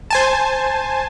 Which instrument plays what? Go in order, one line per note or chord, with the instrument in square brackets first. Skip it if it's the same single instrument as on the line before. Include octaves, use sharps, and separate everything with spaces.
[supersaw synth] C5 G#5 A5